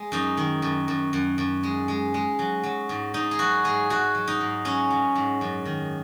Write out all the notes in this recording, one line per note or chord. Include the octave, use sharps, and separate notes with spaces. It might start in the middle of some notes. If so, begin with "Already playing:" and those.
Already playing: G#3
F#2 D#4
D#3
F#2
F#2
F#2
F#2
G#3
G#3
G#3
F#3
F#3
G#2
G#2 D#4
G#4
F#3 F#4
G#2 G#4
G#2 F#4
F#3
D#4
G#2
F#3 C#4
F#3
G#2
F#2
D#3